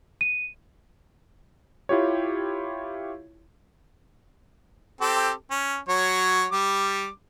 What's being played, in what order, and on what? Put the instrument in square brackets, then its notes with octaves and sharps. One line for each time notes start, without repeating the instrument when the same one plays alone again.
[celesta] D#7
[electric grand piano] E4 F4 G4 C#5
[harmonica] C4 G4 A4
C#4
F#3 C#5
G3 D6